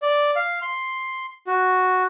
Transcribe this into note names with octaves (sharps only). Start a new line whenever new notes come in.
D5
F5
C6
F#4